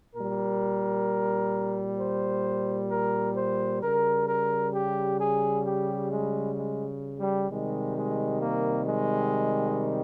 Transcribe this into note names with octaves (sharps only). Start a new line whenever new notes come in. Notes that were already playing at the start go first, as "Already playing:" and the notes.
A#2 G3 A#4
C5
A#4
C5
C#3 G3 A#4
A#4
G4
G#4
G4
G#3
G#3
G3
C3 D#3 G3 G#3
G#3
A#3
G#3